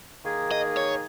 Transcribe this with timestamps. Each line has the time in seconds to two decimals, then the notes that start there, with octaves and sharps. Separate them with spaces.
0.25 D#3 A#3 D#4 G#4
0.51 D#5
0.77 C#5